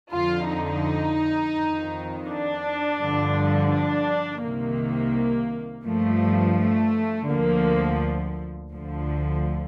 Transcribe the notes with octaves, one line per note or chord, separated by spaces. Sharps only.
F2 D3 F3 F4
D#4
F2 D#3
D4
G2 D3 F3
D4
C2 C3 D#3 A#3
G2 F3 A3
A3
D2 D3 F3 A#3
D2 D3 F3